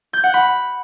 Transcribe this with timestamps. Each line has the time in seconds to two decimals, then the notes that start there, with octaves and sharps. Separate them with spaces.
0.13 G6
0.24 F#5
0.34 B5